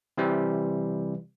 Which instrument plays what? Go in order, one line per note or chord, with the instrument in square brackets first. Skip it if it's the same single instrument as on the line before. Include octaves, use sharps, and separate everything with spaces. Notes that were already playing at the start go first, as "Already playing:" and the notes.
[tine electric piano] C3 E3 G3